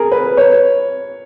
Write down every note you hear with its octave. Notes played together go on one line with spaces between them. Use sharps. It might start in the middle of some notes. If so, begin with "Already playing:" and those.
Already playing: G#4 A#4
B4
C#5